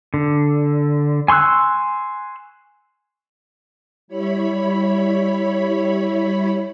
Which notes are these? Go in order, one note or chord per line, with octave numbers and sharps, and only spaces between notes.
D3
G#5 C6 C#6 E6 F#6
G3 E4 C#5 B5